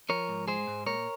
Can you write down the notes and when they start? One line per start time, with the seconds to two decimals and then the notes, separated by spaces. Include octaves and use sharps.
0.09 F3 A#4 C#5
0.29 G#2
0.48 G#3 G#4 C5
0.67 G#2
0.87 A#2 A#4 C#5